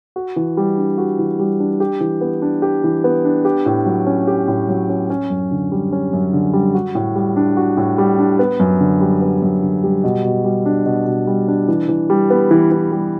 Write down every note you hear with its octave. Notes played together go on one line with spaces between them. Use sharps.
F#4
E3
G3
D4
F#4
E3
G3
D4
G4
E3
B3
D4
G4
E3
B3
D4
G4
A2
F#3
C#4
G4
A2
F#3
C#4
C#4
F#2
D3
G3
C#4
F#2
D3
G3
F#4
A2
G3
D4
F#4
A2
G3
D4
B3
F#2
D3
G3
B3
F#2
D3
G3
B2
B2
G3
D4
B2
B2
G3
D4
E3
E3
G3
B3
E3
E3
G3